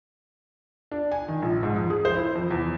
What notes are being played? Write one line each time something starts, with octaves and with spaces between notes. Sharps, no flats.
D4
G#5
D#3
A#1
G#2
F2
G#4
C5
E4
F2
E2